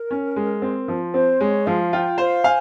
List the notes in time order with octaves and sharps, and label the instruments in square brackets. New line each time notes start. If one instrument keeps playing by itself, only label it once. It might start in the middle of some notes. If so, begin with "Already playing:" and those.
Already playing: [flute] A#4
[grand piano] C#4
G#3
C4
F3
[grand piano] C4 [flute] C5
[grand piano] G#3 [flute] C#5
[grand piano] F3 [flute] F5
[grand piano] F4 [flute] G5
[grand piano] C5 [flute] F5
[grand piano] F5 [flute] G#5